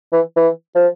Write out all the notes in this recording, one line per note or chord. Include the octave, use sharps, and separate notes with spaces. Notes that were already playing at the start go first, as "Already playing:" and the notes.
E3
E3
F3